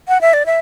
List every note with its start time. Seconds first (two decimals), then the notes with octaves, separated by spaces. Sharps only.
0.08 F#5
0.21 E5
0.33 D5
0.46 E5